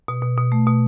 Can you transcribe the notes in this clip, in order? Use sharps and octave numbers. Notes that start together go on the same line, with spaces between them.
B2
B2
B2
A3
B2